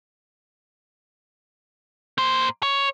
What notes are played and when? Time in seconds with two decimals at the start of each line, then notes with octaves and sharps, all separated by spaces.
2.18 A#3 C5
2.63 C#5